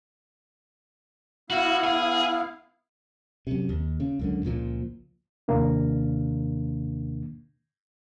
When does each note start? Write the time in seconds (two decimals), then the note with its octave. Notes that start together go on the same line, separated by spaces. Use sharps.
1.50 B3 E4 F#4 F5
1.84 G#4
3.47 F#2 C3
3.69 D#2
4.00 C#3
4.19 C#2 F#2 D3
4.45 C#2 A#2 F3
5.48 D#2 C3 D#3 A#3 D4